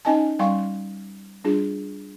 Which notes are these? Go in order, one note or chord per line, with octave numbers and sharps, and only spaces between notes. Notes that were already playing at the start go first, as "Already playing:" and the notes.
C#4 D#4 D#5 G#5 A5
G3 C#4 F5 G5 C6 C#6
G3 D4 F4 G#4